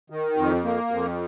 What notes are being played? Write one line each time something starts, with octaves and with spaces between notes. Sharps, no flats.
D#3
F2
A#3
F2